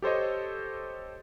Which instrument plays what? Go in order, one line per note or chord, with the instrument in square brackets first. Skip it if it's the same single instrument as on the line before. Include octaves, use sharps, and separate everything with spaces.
[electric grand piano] G4 A4 C5 C#5 D#5